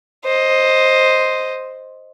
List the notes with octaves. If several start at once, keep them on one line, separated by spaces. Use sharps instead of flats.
C5 D#5